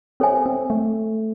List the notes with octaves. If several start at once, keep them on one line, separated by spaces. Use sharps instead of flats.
C4 A4 C#5 E5 G#5
C4
A3